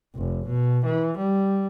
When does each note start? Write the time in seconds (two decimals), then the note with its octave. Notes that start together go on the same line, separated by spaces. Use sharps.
0.16 F1
0.47 B2
0.86 E3
1.17 G3